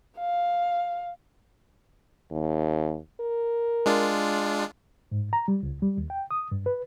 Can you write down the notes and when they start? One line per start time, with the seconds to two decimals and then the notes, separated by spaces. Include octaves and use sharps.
0.18 F5
2.31 D#2
3.20 A#4
3.86 G#3 D4 F4
5.12 G#2
5.33 A#5
5.48 G3
5.63 C#2
5.82 G3
5.98 D#2
6.10 G5
6.31 D#6
6.52 G2
6.66 B4